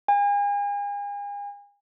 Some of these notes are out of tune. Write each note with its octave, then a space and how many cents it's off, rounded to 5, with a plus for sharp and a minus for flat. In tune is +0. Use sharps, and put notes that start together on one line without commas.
G#5 -40